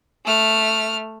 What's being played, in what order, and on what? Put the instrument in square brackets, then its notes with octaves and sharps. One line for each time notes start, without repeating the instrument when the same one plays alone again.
[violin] A3 F6